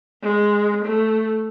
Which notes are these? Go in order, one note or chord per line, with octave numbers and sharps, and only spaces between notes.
G#3
A3